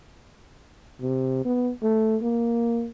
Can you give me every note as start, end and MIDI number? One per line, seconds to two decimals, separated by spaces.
1.01 1.44 48
1.45 1.71 59
1.83 2.17 57
2.22 2.89 58